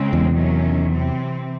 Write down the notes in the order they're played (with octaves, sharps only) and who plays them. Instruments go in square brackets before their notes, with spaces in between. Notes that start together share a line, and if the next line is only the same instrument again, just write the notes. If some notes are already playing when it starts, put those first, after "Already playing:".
Already playing: [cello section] C#3 G#3 C4
[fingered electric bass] E2
[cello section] C3 D#3 F#3 C#4
C3 E3 C4